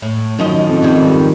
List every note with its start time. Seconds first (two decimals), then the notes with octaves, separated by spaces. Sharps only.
0.02 A2
0.38 F#2 D#3 F3 D#5
0.69 F2
0.82 G#2 D#3 G3